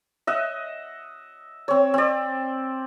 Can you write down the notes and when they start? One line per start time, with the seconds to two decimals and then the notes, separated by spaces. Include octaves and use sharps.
0.27 D#5 E5 F#5
1.68 C4 C#5
1.94 C4 D5